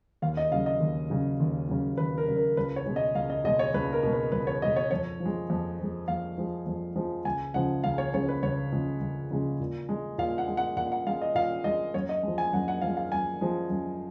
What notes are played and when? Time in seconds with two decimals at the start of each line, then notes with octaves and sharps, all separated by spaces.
0.22 D#2 F5
0.37 D#5
0.51 C#3 F#3 F5
0.66 D#5
0.80 D#2
1.10 C#3 F#3
1.40 D#2
1.69 C#3 F#3
1.98 D#2 B4
2.18 A#4
2.28 C#3 F#3
2.37 A#4
2.57 C#2 B4
2.76 C#5
2.86 B2 G#3
2.96 D#5
3.15 C#2 F5
3.30 D#5
3.44 B2 G#3 D#5
3.59 C#5
3.74 C#2 B4
3.93 A#4
4.03 B2 G#3
4.13 B4
4.32 C#2 B4
4.47 C#5
4.62 B2 G#3 D#5
4.76 C#5
4.91 F2 C#5
5.20 F3
5.25 G#3
5.50 F2
5.79 F3 G#3
6.08 F2 F5
6.38 F3 G#3
6.66 F2
6.96 F3 G#3
7.25 C#2 G#5
7.54 C#3 F3 G#3 F#5
7.84 C#2 F5
7.98 C#5
8.14 C#3 F3 G#3 C#5
8.29 B4
8.43 C#2 C#5
8.72 C#3 F3 G#3
9.01 C#2
9.31 C#3 F3 G#3
9.60 A#2
9.89 G#3
10.18 A#2 F5
10.38 F#5
10.47 G#3
10.57 F#5
10.76 A#2 F#5
10.92 F#5
11.07 G#3 F5
11.22 D#5
11.35 A#2 F5
11.64 G#3 D#5
11.94 F#2 C#5
12.09 D#5
12.23 F3 G#3
12.38 G#5
12.53 F#2 F#5
12.68 F#5
12.81 F3 G#3 F5
12.97 F5
13.12 F#2 G#5
13.41 F3 G#3
13.70 F#2